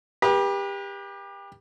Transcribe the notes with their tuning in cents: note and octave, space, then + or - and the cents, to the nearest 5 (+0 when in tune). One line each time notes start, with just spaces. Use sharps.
G4 +25 B4 -35